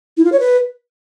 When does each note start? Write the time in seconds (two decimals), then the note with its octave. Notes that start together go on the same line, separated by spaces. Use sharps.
0.17 E4
0.25 F4
0.32 C#5
0.40 B4